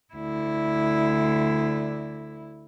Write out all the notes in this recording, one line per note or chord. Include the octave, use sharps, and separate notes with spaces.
D2 E4